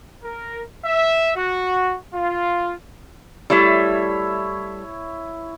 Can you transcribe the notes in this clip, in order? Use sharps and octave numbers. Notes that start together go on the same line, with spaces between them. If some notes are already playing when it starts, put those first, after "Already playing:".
A#4
E5
F#4
F4
G3 A3 E4 C#5 E5